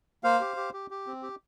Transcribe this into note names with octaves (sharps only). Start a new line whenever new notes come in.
A#3 C5 F5
G4
G4
G4
G4
C4
G4